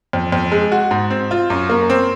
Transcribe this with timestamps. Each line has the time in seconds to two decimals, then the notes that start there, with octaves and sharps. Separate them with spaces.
0.13 F2
0.32 F2
0.52 G#3
0.72 F#4
0.91 G#2
1.10 C4
1.31 F4
1.50 F#2
1.69 A#3
1.90 C4